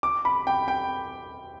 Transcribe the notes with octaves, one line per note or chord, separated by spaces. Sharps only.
D6
B5
G5
G5